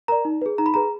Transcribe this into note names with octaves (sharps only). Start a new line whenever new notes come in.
A#4 D5 A#5
D#4
G#4 B4
D#4 A#5
B5
G#4 B4 A#5